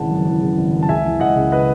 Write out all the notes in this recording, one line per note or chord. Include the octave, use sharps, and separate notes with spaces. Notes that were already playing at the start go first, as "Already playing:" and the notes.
Already playing: G#1 C#3 E3 F#5 A5
F#2
E3
C#3
G#1
F#2
A5
C#2 E5 G#5
E3
C#2 D#5 F#5
C#3
B4 D#5